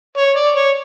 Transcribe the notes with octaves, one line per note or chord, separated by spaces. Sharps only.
C#5
D5
C#5